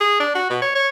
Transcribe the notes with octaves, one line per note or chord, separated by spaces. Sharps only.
G#4
D4
F#4
B2
C#5
C#5